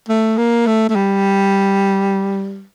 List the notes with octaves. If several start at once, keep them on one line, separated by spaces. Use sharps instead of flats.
A3
A#3
A3
A3
G3